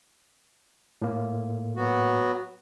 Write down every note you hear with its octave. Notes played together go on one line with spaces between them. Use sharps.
A2 A#3
F#3 B3 F#4